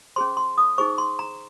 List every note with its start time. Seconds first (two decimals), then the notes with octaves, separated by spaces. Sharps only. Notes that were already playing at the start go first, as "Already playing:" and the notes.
0.16 C#4 G#4 C5 C6
0.37 C6
0.58 D#6
0.78 D#4 G#4 C5 C#6
0.98 C6
1.19 A#5